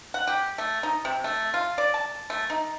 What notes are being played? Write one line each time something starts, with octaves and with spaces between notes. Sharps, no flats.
F#5
G4
A3
D#4
C3
A3
F4
D5
A5
A3
D#4